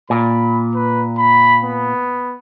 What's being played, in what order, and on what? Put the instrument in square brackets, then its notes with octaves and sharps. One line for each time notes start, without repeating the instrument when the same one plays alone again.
[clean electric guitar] A#2 [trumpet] B5
[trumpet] B4
B5
B3